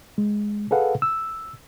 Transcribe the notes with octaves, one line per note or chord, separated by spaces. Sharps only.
G#3
G#4 A4 B4 F5 F#5
E6